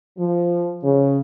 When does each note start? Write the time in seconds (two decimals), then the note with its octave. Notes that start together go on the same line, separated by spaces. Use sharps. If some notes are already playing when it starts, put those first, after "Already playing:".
0.18 F3
0.84 C#3